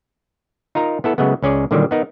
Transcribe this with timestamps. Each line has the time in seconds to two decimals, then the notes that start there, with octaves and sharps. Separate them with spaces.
0.75 D#4 F4 A#4 A#5
1.04 B3 E4 A4
1.18 C#3 F#3 G#3 A3 B3
1.42 C#2 C#4 G#4 D5
1.71 A#2 D3 D#3 F#3 G3
1.91 B3 D#4 A#4